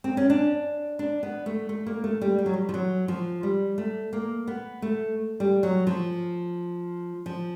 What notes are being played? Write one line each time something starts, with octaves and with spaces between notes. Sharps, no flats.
C4
C#4
D4
D4
B3
A3
A3
A#3
A3
G3
G3
F#3
G3
F3
F#3
F3
G3
A3
A#3
B3
A3
G3
F#3
F3
F3